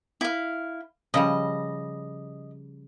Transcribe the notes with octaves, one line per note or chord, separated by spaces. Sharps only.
E4 F5
C#3 F3 G3 D#5